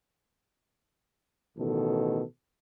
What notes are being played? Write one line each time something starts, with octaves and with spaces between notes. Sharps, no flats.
A1 B2 D#3 A4